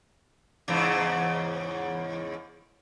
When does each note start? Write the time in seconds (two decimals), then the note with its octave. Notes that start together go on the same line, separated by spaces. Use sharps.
0.68 E2 G#2 C#3